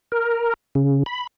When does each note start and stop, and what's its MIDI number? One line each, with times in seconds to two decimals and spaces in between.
0.12 0.54 70
0.75 1.03 49
1.06 1.27 83